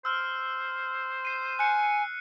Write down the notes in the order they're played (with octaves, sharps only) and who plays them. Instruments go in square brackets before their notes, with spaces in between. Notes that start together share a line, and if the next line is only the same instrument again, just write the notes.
[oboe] C5 [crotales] E6 F6
[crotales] C7 D#7
[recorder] G#5 [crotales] F#6 C#7